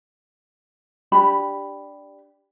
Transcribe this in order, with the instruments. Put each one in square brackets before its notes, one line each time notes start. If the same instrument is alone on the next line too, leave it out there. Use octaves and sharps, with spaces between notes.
[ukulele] D4 G4 B5